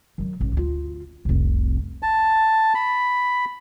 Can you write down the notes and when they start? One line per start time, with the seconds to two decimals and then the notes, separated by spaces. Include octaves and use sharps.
0.18 D#3 F#3
0.40 A1 G#2
0.53 D2 F4
1.25 F1 C2
2.03 A5
2.75 B5